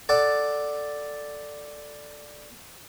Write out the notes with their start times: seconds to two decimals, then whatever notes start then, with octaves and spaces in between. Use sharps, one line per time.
0.09 A4 D5 F#5 A5